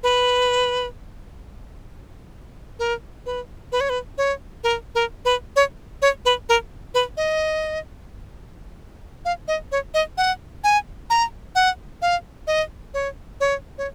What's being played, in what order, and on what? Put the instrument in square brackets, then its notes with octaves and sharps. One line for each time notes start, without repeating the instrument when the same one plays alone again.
[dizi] B4
A#4
B4
B4
C#5
B4
C#5
A#4
A#4
B4
C#5
C#5
B4
A#4
B4
D#5
F5
D#5
C#5
D#5
F#5
G#5
A#5
F#5
F5
D#5
C#5
C#5
C#5